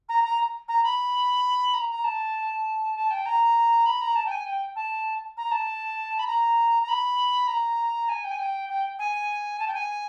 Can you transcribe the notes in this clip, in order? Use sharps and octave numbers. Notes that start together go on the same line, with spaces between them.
A#5
A#5
A#5
B5
A#5
A#5
A5
A5
G5
A#5
B5
A#5
A5
G5
G#5
G5
A5
A#5
A5
B5
A#5
A#5
B5
A#5
G#5
G5
G#5
G5
G5
G#5
A5
G5
G#5